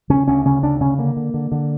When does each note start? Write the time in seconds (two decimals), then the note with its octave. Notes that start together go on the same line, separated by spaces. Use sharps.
0.09 C#3 C#4
0.27 D2 C#4
0.45 C#3 C#4
0.63 D2 D4
0.80 C#3 C#4
0.98 D3 A#3
1.17 D3
1.34 D3
1.52 D3